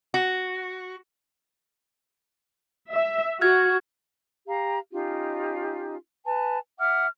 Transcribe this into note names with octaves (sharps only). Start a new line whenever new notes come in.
F#4
E5
F#4 F6 G#6
G4 F5 A#5
C#4 D#4 F4 G4
B4 G#5 A5
E5 F#5 D6 F6